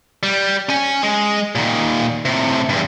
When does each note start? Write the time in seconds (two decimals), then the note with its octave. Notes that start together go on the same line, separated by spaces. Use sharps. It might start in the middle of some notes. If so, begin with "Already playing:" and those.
0.23 G3
0.69 C#4 G#5
1.03 G#3
1.55 A#2 D#3
2.25 A2 C3
2.69 E2 G2